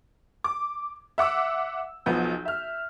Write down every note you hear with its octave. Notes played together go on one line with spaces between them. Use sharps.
D6
E5 F#5 D6 E6
B1 F3 B3 G6
E5 F6